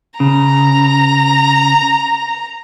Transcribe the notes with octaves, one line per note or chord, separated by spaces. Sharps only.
C#3 A#5